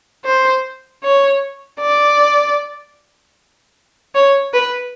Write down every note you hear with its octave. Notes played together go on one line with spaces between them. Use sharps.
C5
C#5
D5
C#5
B4